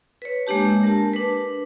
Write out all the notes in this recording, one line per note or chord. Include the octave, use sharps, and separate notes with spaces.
B4 C#5
G#3 A#3 D4 G4 A5
A#4 A5
D4 B4